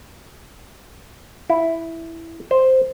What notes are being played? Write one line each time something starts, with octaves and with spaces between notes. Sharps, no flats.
E4
C5